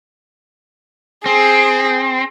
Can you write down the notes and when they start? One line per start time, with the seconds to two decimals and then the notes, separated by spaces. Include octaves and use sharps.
1.26 C4 G#4